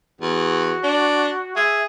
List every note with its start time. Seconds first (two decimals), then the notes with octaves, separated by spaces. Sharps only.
0.21 E2 F#4
0.83 D4
1.56 G#4 E5